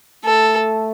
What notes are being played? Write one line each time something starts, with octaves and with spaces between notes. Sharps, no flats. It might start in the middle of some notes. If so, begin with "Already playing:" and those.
A3 A4